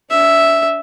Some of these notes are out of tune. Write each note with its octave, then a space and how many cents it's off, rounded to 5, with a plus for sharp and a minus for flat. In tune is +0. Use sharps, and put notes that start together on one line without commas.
D4 -40 E5 +0